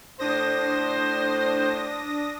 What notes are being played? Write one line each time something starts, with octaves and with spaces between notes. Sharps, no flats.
A2 D4 C5 D#6 A#6